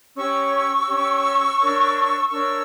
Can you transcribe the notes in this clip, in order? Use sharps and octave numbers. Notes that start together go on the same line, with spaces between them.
C#4 G4 C#5 C#6 E6
C#4 G4 C#5
D4 A#4 C#5
D4 A#4 C#5 C#6 E6